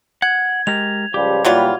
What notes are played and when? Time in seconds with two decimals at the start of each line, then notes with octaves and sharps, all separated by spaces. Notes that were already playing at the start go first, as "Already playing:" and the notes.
0.22 F#5 G#6
0.67 G#3 G4 A#4 F7
1.14 C#2 F3 G3 G4
1.45 A#2 E3 F#3 G3 F4